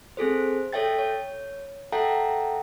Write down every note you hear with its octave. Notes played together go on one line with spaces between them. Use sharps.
C4 G#4 A4 C5
A4 C#5 E5 G5 A6
C#5
A4 E5 F#5 G5 A5 A#5